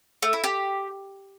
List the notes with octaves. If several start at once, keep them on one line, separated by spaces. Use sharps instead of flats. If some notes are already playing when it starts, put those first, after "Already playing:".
A3
E4
G4